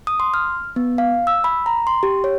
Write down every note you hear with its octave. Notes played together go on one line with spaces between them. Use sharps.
D#6
C6
F6
B3
F5
E6
B5
A#5
C6
G4
C#5